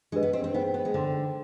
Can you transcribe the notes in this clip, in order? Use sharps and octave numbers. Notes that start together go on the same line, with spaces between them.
G#3 D4 G4 B4 D#5
B3
C4
C4
B3 D#4 G#4 C5 G5
B3
G#3
D3 C5 G5 C6